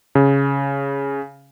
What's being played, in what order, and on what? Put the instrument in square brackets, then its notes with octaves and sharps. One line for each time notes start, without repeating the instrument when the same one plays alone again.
[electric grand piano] C#3